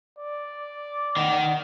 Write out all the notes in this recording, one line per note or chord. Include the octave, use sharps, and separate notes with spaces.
D5
D#3 F#5